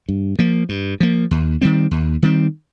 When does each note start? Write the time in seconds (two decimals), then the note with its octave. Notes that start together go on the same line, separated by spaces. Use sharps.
0.09 G2
0.39 F3 A#3
0.69 G2
1.00 F3 A#3
1.31 D#2
1.61 D#3 G3 C4
1.91 D#2
2.22 D#3 G3 C4